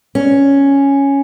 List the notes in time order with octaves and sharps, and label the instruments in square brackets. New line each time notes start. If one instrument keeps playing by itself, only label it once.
[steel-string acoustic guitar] C#4